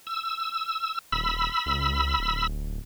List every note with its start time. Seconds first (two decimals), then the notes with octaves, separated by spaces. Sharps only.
0.07 E6
1.12 D#1 B5 E6
1.66 C#2
2.19 D1